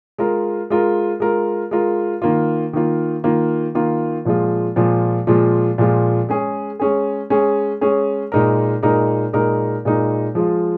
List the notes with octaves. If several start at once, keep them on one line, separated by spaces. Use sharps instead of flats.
G#3 F4 A#4
G#3 F4 A#4
G#3 F4 A#4
G#3 F4 A#4
D#3 A#3 F4
D#3 A#3 F4
D#3 A#3 F4
D#3 A#3 F4
A#2 F3 G#3 F4
A#2 F3 G#3 F4
A#2 F3 G#3 F4
A#2 F3 G#3 F4
G#3 C#4 G#4
G#3 C#4 G#4
G#3 C#4 G#4
G#3 C#4 G#4
A#2 G#3 D#4 A#4
A#2 G#3 D#4 A#4
A#2 G#3 D#4 A#4
A#2 G#3 D#4 A#4
F3 G#3 F4